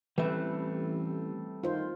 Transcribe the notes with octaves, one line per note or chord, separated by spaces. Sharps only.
A1 E3 G3 A3 C4 B4 E5
D#3 F4 C5